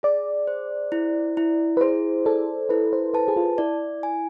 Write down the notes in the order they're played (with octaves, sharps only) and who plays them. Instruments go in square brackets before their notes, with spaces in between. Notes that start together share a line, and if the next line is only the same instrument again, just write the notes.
[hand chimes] G#4 [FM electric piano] D5
[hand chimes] C5
E4
E4
[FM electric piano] B4
[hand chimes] G#4 [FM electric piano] C5
[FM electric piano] A4 [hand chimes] D5
[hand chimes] E4 [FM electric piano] B4
[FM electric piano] C5
[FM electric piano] B4 [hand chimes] A5
[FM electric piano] G#4
F4
[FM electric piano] E4 [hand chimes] D5
[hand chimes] G#5